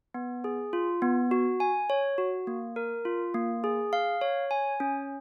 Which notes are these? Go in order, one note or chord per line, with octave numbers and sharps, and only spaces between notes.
B3
G#4
F4
B3
F#4
G#5
C#5
F#4
A#3
A#4
F4
A#3
G#4
F5
C#5
G#5
C#4